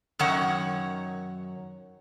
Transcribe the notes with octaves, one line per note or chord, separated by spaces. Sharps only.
F#2 D#3 C#5 F#5